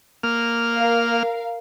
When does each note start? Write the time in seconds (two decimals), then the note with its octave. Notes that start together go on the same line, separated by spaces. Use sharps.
0.23 A#3 F6
0.78 A#4 F5